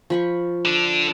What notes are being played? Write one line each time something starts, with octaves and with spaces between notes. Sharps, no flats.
F3 B5 C#6
D3 D4